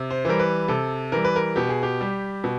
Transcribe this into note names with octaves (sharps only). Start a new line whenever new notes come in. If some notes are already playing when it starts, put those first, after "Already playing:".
Already playing: C3
C5
E3 G3 A#4
B4
C3 A4
E3 G3 A#4
B4
A#4
B2 G4
G#4
G4
G3
B2